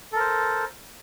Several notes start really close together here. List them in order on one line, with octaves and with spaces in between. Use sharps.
A4 A#4 C5